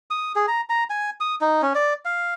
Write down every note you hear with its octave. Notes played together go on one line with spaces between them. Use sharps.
D#6
G#4
A#5
A#5
G#5
D#6
D#4
C#4
D5
F5